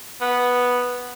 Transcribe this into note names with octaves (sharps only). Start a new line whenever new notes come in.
B3